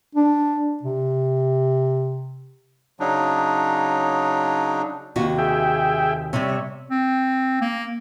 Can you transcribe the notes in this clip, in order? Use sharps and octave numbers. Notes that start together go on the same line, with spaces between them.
D4
C3
C#3 F#3 D4 D#4
D#2 C3 F#4
G#4 E5 G5
C3 G3 C#5 E5
C4
A#3